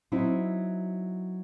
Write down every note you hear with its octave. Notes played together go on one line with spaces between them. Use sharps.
F#3 C4 C#4 D#4 E4